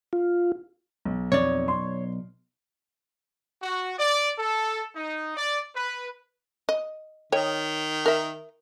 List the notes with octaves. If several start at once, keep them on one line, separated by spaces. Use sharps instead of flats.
F4
B1
B1 F2 C#5 D5
C6
F#4
D5
A4
D#4
D5
B4
D#5
D#3 C#5 D#5 G5
A#4 E5